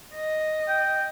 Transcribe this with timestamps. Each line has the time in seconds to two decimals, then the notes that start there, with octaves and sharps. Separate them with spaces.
0.15 D#5
0.69 G5